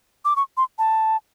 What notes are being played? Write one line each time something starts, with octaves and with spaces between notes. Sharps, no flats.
D6
C#6
C6
A5